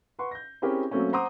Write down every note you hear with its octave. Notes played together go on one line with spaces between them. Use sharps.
B4 F#5 C6 C#6
G6 A#6
C4 C#4 E4 G4 G#4 A#4
F#3 A3 A#3 C4 C#4
C5 F#5 A#5 C6 D6 D#6